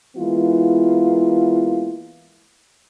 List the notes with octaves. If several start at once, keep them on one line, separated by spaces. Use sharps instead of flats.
E3 G#3 A#3 B3 E4 F4